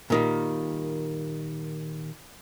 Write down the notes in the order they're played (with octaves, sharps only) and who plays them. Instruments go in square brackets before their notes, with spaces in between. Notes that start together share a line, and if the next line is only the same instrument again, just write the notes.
[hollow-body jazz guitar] A#2 D#3 G3